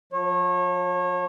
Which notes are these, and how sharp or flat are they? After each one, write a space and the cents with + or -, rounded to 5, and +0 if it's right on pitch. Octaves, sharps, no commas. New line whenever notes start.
F3 +30 C#5 -30